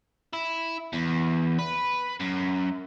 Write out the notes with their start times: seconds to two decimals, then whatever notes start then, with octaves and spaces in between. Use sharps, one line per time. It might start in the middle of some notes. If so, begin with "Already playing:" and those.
0.33 E4
0.93 E2
1.59 B4
2.20 F#2